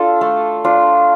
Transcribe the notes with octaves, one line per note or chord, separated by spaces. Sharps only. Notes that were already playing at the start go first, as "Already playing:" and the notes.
Already playing: D4 F4 A4
A3
D4 F4